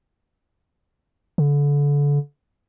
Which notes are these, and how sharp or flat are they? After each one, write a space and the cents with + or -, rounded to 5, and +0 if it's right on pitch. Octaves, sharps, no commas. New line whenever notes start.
D3 -30